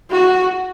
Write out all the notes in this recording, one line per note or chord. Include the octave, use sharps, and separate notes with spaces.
F#4